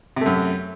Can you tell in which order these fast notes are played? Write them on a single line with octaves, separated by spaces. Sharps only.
C3 A3 F#2